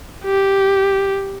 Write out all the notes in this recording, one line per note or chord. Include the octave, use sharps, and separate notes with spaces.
G4